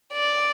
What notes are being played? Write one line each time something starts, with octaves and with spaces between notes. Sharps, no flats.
D5